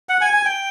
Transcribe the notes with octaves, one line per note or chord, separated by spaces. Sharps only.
F#5
G#5
G#5
G5